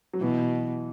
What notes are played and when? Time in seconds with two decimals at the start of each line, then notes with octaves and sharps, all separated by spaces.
0.14 F#3
0.21 B2 E3